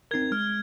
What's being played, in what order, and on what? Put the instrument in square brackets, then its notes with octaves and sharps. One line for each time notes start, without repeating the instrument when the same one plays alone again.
[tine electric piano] C4 D#4 A#4 [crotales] G#6
[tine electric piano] G#3 [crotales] F6